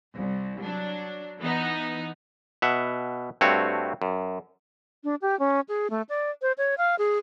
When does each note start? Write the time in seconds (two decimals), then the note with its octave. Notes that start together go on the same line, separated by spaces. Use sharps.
0.13 C2
0.62 F#3 D4
1.39 E3 B3 D#4
2.62 B2 E5 F#5
3.41 G2 A3 C4 F#4 C#5
4.02 F#2
5.04 D4
5.22 G4
5.39 C#4
5.68 G#4
5.90 A3
6.09 D5
6.42 C5
6.58 C#5
6.78 F5
6.99 G#4